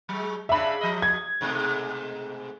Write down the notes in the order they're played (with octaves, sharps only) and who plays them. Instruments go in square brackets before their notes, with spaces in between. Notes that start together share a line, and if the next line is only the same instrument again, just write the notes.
[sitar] F#3 G#3
[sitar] C#3 D4 [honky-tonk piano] E5 B5
[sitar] F3 D#5
[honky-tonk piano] G#6
[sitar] G#2 B2 A3